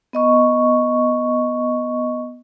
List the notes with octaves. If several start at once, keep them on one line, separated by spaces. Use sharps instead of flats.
B3 D#5 C#6